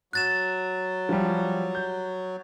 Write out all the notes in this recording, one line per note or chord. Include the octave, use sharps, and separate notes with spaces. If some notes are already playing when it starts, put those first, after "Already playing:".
F#3 F#6 A6 E7
F3 G3
G6